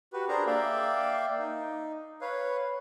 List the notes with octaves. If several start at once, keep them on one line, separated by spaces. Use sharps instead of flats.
F#4 G4 B4
D4 G#4 A#4 C5 A#5
A#3 D5 E5 F5 G5
D#4
B4 C#5 F5